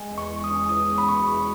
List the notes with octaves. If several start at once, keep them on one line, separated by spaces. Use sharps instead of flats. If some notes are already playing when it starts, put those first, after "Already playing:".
Already playing: G#3
E2
C#6
E2
D#6
C#4
E2 D#6
E2
B5
B2 C#6
E2